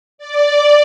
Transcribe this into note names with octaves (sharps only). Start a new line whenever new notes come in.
D5